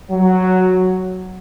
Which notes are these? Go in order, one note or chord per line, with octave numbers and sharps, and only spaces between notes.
F#3